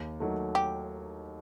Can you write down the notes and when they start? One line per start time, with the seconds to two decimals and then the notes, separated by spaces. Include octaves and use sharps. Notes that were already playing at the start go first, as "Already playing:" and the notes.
Already playing: D#2
0.20 D#3 F#3 A3
0.55 G4